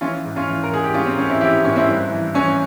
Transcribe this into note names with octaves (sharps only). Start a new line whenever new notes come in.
E3 C#4 F4
G#2
C#4 F4
E3
A#4
G#2 G#4
G4
G#2 C#4 F4
C4
G#2 C#4
C4 E4
E3 E4 G4
G#2 C#4
C4 E4
G2
E3
E3 C#4